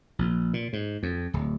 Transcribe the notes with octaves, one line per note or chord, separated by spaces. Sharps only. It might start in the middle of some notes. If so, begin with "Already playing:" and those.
A#1
A#2
G#2
F2
D1